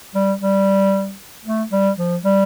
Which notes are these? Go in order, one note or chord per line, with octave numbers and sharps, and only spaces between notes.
G3
G3
A3
G3
F3
G3